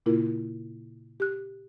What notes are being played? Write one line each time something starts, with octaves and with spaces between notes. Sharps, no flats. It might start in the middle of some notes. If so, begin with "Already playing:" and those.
A#2 C#3 A#3 E4 F4 A#4
G4 F#6